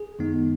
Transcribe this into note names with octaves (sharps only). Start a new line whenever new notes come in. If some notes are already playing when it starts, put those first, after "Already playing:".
Already playing: G#4
F#2 D#3 G#3 B3 D#4